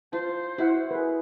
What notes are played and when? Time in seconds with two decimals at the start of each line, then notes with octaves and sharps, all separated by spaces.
0.13 F4 C5 A5
0.58 E4 F#4 E5 F#5
0.91 G#4 A#4 B4